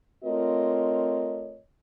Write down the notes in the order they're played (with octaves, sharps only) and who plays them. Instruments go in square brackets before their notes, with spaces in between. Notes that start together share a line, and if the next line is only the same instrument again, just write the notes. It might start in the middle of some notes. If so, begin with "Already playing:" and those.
[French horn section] A3 C4 F4 A#4 C#5 D#5